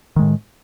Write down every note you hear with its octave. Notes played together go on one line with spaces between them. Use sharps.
A2 D#3 G#3